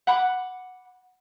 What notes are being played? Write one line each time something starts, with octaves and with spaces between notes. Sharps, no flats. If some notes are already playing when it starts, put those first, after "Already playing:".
F#5 B5 D6